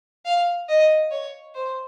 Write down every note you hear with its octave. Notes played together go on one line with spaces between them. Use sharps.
F5
D#5
C#5
C5